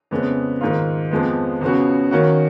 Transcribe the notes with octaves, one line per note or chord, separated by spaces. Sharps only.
F2 C#3 G#3 B3
G#2 D#3 A#3 F4
F2 F3 G#3 B3
C#2 C#3 F3 B3 F#4
D#3 A#3 C#4 F#4